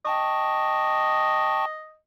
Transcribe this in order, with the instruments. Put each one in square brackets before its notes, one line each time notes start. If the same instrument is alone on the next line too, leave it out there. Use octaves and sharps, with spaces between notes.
[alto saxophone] D#5 [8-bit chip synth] G5 A5 C#6